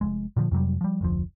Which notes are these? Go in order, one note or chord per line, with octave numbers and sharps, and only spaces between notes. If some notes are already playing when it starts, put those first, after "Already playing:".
F1 F2 G#3
A#2 D3 D#3 F3
F2 C3 F#3 G3
F3 G3
F1 D2 F3